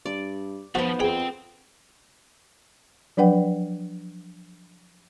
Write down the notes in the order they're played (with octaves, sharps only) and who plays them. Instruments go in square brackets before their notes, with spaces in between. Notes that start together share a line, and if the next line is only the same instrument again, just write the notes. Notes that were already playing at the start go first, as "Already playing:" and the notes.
[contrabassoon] G2 [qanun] D5
[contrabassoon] B1 [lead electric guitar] F3 [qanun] B3 C5 [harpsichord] F#4
[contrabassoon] F2 [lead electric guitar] C4 G5 [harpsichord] G#4
[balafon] F3 F#3 D4 B4 F#5 G5